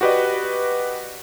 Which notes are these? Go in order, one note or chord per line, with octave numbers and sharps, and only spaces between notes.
F#4 G4 B4 D5 D#5